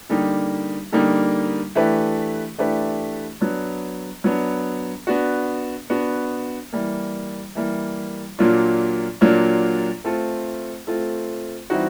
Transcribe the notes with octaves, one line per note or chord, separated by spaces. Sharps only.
D3 G3 A#3 D#4 G4
D3 G3 A#3 D#4 G4
E3 A3 D4 G4 B4
E3 A3 D4 G4 B4
F#3 B3 D4
F#3 B3 D4
B3 D4 F#4
B3 D4 F#4
E3 G3 A#3
E3 G3 A#3
A#2 F#3 A#3 D4 F4
A#2 F#3 A#3 D4 F4
A3 C4 F4 A4
A3 C4 F4 A4
E3 G3 C4 D#4 F#4